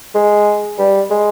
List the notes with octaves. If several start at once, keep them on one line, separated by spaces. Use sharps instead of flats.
G#3
G3
G#3